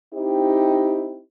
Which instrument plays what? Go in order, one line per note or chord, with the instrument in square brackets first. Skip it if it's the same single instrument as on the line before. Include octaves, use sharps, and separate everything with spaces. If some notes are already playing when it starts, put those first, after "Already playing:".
[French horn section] C4 D#4 E4 G4